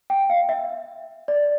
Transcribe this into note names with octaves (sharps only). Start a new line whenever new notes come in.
G5
F5
E5
D5